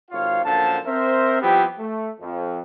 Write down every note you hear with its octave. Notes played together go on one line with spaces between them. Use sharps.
G#1 C3 F4 C#5 F5
A#1 F#2 D3 C5 F5 A5
C4 A#4 C5 E5
F3 G3 B3 C4 E4 G4
A3
F2